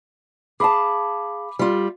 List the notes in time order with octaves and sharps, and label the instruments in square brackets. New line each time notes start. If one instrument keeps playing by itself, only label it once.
[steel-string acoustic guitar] G#4 F5 A5 [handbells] B5 D6
[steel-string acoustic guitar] G3 F4